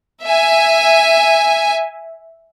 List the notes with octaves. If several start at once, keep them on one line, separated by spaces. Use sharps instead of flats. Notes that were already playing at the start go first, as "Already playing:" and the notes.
E5 G#5